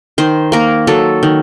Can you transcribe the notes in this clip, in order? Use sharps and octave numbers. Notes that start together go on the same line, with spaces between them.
D#3 C5
A#3 A#4
F#3 A4
D#3